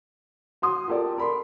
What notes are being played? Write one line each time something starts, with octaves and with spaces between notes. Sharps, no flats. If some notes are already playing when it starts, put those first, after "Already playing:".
F#4 C6 D#6
F4 G4 A4 A#4 D5
A#4 B5 C6